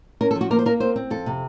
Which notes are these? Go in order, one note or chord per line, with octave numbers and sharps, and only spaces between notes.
C#4 A#4
A4
F3
F#4
A#3 A#4
C5
A#3 A#4
C4 C5
C4
F2 A4
C3